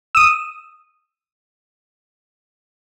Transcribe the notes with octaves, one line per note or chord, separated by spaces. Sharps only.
D#6 E6